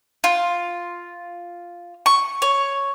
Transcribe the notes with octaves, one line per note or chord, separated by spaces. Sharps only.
F4
C#6
C#5